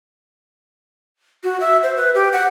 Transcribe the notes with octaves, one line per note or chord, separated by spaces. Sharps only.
F#4
E5
C5
B4
G4
F#5